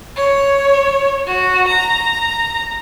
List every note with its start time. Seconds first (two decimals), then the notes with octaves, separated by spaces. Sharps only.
0.16 C#5
1.27 F#4
1.68 A#5